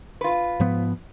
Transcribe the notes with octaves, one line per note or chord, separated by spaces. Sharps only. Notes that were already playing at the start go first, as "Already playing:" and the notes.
F4 B4
G#2 F3 B3